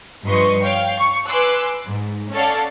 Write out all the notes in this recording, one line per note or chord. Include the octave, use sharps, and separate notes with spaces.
G2 F3 B4 D#5 C6 C#6
C#5 F5 G5
C#6
B4 G#5 C6 D6 E6 F#6
G#2
C#4 A4 C#5 D5 F5 F#5